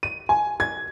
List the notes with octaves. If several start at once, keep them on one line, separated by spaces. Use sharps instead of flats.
D#7
G#5
G#6